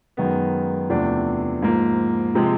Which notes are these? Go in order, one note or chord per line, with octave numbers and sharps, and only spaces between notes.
F#2 D#3 G#3 B3
E2 C3 F3 A3 D4
G#2 F3 A#3
C3 F3 G#3